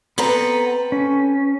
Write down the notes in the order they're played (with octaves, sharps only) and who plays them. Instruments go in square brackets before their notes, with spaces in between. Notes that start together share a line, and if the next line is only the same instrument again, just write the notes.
[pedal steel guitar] B3 A#5 [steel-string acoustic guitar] C4 A4 B4
[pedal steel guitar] C#4